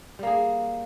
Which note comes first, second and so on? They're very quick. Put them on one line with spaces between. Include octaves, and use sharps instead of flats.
G3 A#3 G#4